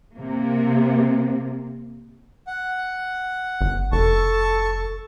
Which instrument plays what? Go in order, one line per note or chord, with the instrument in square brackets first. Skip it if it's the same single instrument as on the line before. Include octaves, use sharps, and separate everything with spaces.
[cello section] C3 A#3
[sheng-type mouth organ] F#5
[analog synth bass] G1
[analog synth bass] F1 [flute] A4 [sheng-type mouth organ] A5 C#6